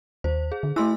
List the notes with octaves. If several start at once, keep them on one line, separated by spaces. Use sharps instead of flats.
D#2 C5
G#4
D3
A3 E4 C6 E6